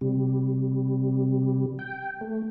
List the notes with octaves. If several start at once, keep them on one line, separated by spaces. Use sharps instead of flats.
C3 G3
G5
A3